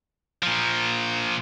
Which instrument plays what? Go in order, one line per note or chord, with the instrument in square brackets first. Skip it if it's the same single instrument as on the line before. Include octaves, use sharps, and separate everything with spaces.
[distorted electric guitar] A#2 F3